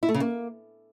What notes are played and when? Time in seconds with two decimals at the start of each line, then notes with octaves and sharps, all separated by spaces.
0.03 E4
0.09 A3
0.14 C#3
0.20 A#3